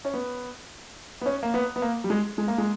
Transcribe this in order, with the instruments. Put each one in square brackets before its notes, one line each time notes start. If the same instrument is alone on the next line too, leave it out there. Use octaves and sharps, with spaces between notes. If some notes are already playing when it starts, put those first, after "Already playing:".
[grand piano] C#4
B3
B3
C#4
A#3
B3
B3
A#3
G3
G#3
G#3
A#3
G#3